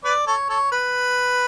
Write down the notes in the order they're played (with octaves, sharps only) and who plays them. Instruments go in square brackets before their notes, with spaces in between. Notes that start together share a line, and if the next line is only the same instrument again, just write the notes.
[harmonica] B4 D5
A4 C#5
A4 C#5
B4